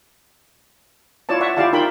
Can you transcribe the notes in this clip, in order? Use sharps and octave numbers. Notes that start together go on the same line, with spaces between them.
E4 F4 C#5 D5 A5
D5 E5 F#5 C#6
E4 F4 G4 D5 F5 A5
D#4 F4 A#4 G5 B5